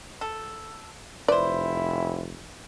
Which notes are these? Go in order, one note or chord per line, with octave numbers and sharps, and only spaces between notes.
A4
F1 E4 B4 C5 D5